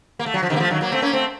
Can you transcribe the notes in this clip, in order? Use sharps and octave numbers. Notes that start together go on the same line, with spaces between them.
A#3
A3
F#3
F3
C3 D#3
A#3
F3 A3
D#3 F#3
F#3 A#3
A3 C4
A#3 C#4
A3 C4